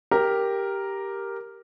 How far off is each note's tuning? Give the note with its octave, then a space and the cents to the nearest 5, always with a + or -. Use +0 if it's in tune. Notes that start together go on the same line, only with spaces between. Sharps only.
G4 +0 A#4 +0